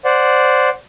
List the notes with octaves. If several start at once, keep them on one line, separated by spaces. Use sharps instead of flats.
C5 D5 F#5